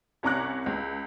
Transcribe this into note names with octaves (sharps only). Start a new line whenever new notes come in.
C2 C#4 A#5 D6 F#6
C#2